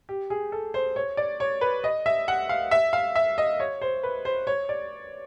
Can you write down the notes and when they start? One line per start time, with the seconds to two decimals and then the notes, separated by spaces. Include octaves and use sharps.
0.09 G4
0.30 G#4
0.52 A4
0.74 C5
0.96 C#5
1.17 D5
1.40 C#5
1.61 B4
1.84 D#5
2.06 E5
2.28 F#5
2.49 F5
2.71 E5
2.93 F5
3.16 E5
3.38 D#5
3.60 C#5
3.81 C5
4.03 B4
4.25 C5
4.47 C#5
4.69 D5